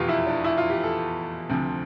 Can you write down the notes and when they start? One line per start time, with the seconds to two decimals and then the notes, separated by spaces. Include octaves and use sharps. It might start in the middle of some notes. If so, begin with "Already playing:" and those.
Already playing: F1 E2 B2 F4 G4 B4
0.09 E4
0.26 D4
0.44 E4
0.58 F4
0.70 G4
0.83 A4
1.49 D2 C3 F3 C4